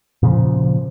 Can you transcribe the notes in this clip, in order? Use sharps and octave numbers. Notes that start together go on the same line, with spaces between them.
A#2 C#3 E3 F3